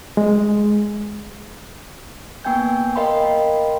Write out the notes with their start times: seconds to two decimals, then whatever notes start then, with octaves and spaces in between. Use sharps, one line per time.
0.17 G#3
2.45 A#3 B3 G5 G#5 G6
2.96 A#4 D#5 F5 G5 B5 C6